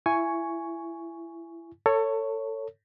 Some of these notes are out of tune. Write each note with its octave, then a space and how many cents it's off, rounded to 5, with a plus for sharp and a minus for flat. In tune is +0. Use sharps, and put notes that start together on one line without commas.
E4 +25 G#5 +0 C#6 +5
A4 +25 C#5 +0